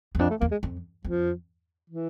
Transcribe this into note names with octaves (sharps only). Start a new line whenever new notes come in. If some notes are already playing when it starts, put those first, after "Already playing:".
E2
F2 D4
A3
E2 A#3
G#3
F2
F2 F3
E3